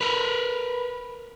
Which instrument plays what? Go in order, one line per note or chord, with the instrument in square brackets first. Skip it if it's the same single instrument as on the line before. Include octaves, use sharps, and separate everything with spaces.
[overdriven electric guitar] A#4 B4